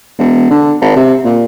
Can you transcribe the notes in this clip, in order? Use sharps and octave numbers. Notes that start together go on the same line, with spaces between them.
E1
D3
G#1
C3
A#2